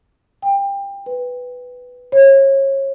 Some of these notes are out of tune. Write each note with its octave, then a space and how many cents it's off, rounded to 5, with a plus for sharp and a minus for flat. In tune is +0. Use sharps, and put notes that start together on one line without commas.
G5 +25
B4 +5
C#5 -30